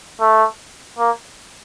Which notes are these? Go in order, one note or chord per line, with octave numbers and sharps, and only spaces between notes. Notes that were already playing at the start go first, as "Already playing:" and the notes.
A3
A#3